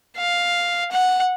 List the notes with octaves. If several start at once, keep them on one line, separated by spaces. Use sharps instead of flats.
F5
F#5